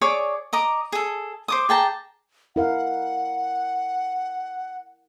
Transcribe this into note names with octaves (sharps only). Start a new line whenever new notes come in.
G#4 C#5 D5 D6
D#5 A#5 D6
G#4 A4
C5 D6 D#6
G#4 G5 A5 A#5
E4 A#4 F5 F#5